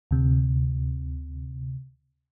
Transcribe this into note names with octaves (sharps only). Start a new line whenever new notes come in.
D2 C3